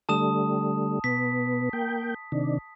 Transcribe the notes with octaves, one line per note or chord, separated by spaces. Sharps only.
D3 G3 A3 A5 D#6 E7
B2 B3 B6
A#3 G5
C3 D#3 D4